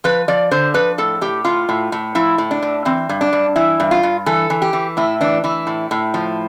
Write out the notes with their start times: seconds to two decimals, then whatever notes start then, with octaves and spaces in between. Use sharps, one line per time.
0.04 F3 B4
0.28 F3 D5
0.51 D3 C5
0.74 F3 B4
0.98 A2 A4
1.21 A2 G4
1.45 A2 F4
1.69 A2
1.92 A2
2.15 F3 E4
2.38 A2
2.51 D4
2.62 A2
2.85 E3 C4
3.09 G2
3.21 D4
3.33 G2
3.56 E3 E4
3.80 G2
3.91 F4
4.03 G2
4.26 E3 A4
4.50 E3
4.62 G4
4.73 E3
4.97 A2 E4
5.21 E3 D4
5.44 E3 E4
5.67 A2
5.91 A2
6.14 F3